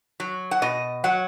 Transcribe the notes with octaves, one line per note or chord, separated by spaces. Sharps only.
F#3
F#5
B2 D#5
F#3 F#5